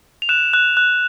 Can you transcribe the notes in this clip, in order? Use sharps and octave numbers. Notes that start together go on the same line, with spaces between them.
F7
F#6 E7
F#6
F#6